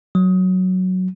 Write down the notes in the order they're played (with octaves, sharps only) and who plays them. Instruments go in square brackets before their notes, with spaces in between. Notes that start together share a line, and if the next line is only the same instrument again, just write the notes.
[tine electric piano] F#3